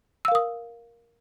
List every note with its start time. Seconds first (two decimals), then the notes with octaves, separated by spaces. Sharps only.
0.25 E6
0.28 F5
0.32 A#4
0.35 D#6